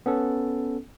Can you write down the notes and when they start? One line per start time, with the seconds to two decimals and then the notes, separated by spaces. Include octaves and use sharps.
0.06 B3 C#4 A4